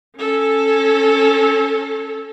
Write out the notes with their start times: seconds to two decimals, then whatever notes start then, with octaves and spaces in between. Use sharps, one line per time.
0.18 C#4 A4